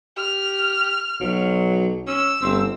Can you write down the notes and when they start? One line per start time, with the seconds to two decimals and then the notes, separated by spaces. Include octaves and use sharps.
0.17 G4 F6
1.21 B1 F#3
2.07 C#4 E6
2.42 G1 C4